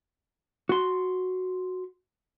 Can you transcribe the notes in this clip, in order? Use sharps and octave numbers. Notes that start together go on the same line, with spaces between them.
F#4 C6